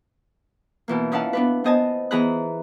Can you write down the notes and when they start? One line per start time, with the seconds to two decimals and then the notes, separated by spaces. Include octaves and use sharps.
0.88 B2 E3 A#3
1.12 C#4 D#4 E4 F5 F#5 A5
1.33 B3 D4 B4
1.64 B3 C5 D#5 G#5 A5
2.11 E3 B3 G#4 A#5 B5 F#6